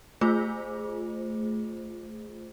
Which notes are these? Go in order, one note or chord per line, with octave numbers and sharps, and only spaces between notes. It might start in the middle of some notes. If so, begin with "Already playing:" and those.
A3 F4 G#4 C5